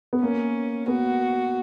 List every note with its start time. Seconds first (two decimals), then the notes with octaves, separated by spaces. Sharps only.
0.13 B3
0.21 A#3 C#4
0.88 B3 F#4